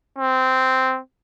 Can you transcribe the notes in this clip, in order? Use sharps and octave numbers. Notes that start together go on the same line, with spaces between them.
C4